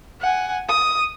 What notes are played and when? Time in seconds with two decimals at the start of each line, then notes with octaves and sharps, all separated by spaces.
0.21 F#5 G#5
0.69 D#6